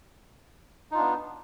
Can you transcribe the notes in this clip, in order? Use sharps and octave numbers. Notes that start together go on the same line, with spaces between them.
B3 D4 D#4 F4